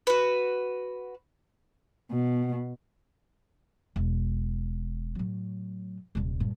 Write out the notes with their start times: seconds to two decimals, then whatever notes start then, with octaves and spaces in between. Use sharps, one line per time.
0.07 F#4 B4
2.11 B2
3.96 E1
5.15 A2 F#3
6.15 D#1 C2
6.40 G2 A#2